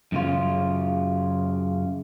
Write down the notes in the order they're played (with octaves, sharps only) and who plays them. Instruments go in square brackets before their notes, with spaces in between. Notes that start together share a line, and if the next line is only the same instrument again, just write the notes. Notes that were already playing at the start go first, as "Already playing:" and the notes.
[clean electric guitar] F#2 C#3 F4